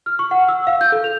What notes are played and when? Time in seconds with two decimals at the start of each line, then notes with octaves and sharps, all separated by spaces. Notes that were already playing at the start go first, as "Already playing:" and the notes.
0.06 F6
0.19 C#6
0.31 F#5
0.48 E6
0.67 F5
0.81 G6
0.92 A4
1.04 F7